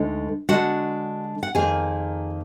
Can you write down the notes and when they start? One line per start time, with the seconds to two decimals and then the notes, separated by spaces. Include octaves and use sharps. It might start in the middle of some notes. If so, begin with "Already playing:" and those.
Already playing: D2 D3 G#3 D#4
0.49 D3 G#3 D4 F#4 F#5
1.43 F#5
1.55 F2 D#3 A#3 G#4 G#5